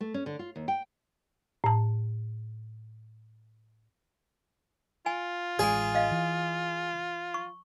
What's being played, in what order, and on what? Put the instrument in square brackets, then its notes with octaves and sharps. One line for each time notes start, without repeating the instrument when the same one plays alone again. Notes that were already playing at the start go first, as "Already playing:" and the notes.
[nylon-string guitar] A3
C#4
D3
F4
D#2
G5
[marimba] A2 A5
[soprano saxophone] F4 [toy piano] G#5
[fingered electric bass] A1 G#3 [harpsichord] G#4 [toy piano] D5 G#5
[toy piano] D#5 F5
[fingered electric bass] E3
[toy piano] C#6